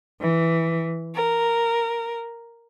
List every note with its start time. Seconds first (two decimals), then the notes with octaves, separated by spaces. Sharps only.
0.20 E3
1.15 A#4